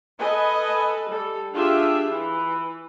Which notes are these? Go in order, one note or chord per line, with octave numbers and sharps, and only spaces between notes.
A4 B4 D#5 G#5
G3 A4
D4 F4 G4 G#4 E5
E3